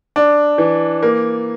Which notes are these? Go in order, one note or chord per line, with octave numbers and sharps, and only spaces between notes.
D4
E3
A#3